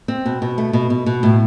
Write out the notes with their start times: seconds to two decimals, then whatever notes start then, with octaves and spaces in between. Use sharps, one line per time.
0.08 C4
0.26 B2
0.42 B2
0.58 A3
0.73 B2
0.90 B2
1.06 B2
1.23 A2